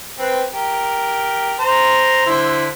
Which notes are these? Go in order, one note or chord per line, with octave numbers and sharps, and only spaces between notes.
C4 B4
G4 A#4
C5 A#5
D3 E4 C5